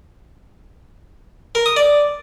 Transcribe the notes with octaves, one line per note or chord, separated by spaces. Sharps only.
A#4
D#6
D5